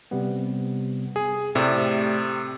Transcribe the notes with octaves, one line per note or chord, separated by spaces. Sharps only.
C3 G3 B3
G#4
A2 C3 A3 G4 D5